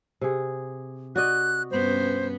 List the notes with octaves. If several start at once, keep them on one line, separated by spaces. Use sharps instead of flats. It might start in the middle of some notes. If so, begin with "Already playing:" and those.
C3 G#4
F#4 D5 D#5 F#6
G2 B3 C#4 C5